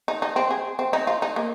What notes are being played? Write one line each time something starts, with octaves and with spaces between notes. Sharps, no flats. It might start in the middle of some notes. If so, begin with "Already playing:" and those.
D#4
D#4
C4
G#4
C4
D#4
F4
D#4
A#3